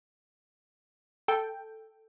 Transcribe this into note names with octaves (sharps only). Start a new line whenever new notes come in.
A4 G5